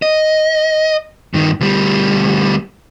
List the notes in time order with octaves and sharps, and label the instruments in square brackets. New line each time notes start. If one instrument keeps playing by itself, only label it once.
[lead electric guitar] D#5
G2 D#3
D2 G3